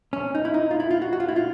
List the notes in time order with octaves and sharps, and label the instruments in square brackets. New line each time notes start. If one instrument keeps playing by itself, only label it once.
[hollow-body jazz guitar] C#4
D#4
E4
D#4
F4
E4
F4
F#4
F#4
F4
E4
F4